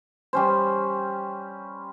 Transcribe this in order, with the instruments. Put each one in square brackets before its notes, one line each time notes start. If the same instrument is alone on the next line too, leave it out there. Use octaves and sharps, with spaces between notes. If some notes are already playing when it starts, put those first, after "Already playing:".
[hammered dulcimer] G3 C#4 C5